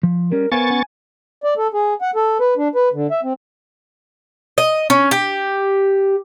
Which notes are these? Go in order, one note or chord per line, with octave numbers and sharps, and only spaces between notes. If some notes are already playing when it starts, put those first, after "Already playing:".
F3
G3 C#4 A#4
B3 A#4 C5 F5 G#5 C#6 A6
C#4 F#5
D5
A4
G#4
F#5
A4
B4
D4
B4
D3
E5
C4
D#5
C#4
G4